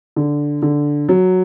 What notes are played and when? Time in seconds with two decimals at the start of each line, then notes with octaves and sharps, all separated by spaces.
0.16 D3
0.62 D3
1.09 F#3